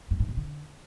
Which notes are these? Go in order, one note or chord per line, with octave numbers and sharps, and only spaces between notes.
G2
G#2
B2
D3